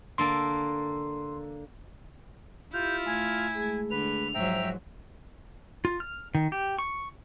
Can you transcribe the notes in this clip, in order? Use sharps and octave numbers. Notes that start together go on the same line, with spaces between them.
D3 A#3 A4 C6
E4 F4 G4 F6 G6
A3 G#5
G#3 A3 G#4
D3 B4 F7
G#2 F3 F#3 C5 E5 G5 A#5
F4
F6
D#3
G4
C#6